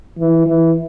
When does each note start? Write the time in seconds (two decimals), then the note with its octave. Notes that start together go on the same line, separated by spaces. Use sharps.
0.18 E3
0.46 E3